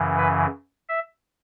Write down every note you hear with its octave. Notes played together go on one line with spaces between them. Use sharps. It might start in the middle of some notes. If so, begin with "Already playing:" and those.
Already playing: F#2 C#3 E3
B4
E5